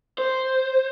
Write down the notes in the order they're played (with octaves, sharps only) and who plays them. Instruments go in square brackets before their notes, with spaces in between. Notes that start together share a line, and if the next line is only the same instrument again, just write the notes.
[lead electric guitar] C5